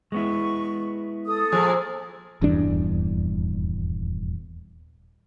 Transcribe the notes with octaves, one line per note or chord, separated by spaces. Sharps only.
G#3 B3 E4 C#6
A4 D#6
A#2 F3 G#4
D#1 E2 G2 D4